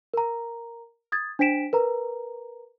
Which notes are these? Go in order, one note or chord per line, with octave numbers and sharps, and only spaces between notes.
A#4 A#5
D#6 G#6 A6
D4 C5 G5 B6 D7 E7
A#4 B4 A#5